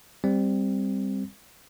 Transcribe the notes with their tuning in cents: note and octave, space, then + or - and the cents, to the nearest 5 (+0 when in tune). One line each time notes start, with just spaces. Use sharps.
G3 +15 C4 +0